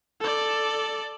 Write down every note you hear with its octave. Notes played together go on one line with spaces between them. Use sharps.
A4 D5